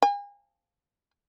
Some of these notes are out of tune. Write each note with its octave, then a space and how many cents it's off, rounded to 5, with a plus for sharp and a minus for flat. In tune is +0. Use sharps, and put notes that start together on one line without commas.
G#5 -40